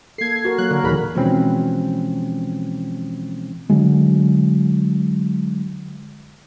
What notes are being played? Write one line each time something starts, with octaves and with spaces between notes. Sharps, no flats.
A#3 A4 G#6 C7
F#4 A#4
F#3 A#3 F#6
D3 A#4
D#2 A#2 D#3 E3 G#4 B5
B2 E3 F3 G#3 C4 C#4
D3 F#3 G#3